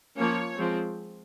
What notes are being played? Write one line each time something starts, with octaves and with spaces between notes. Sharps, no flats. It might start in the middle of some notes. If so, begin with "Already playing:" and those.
F3 A#3 C#4 C#5
F3 G#3 C4